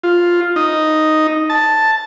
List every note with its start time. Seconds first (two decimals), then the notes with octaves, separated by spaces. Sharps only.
0.03 F4
0.56 D#4
1.50 A5